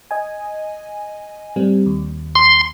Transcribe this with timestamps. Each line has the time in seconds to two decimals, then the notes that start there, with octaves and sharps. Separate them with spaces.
0.11 D#5 G#5
1.56 A2 G3 C4
1.86 D#2
2.35 C6